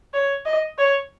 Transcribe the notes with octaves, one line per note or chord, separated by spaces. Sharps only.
C#5
D#5
C#5